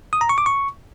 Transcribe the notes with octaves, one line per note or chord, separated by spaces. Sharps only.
D#6
A#5
C#6
D6
C#6